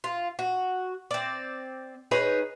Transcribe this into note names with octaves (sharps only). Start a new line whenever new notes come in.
F4
F#4
C4 D5
D#4 G#4 B4 C#5